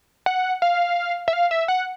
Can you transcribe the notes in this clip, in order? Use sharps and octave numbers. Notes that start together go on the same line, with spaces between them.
F#5
F5
E5
F5
E5
F#5